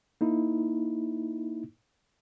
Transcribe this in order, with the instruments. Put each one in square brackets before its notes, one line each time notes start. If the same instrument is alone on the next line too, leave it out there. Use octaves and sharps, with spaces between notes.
[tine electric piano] A#3 D#4 E4